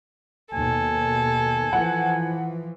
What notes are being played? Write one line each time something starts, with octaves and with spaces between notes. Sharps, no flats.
D#2 B2 A4 G#5
E3 F3 F#5